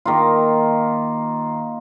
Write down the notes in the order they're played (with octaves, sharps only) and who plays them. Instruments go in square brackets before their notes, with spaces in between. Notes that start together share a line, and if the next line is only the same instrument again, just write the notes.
[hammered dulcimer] D#3 A#3 F4